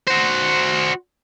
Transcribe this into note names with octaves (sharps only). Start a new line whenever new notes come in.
F#4 C5